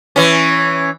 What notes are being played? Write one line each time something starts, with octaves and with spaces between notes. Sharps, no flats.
E3 C#4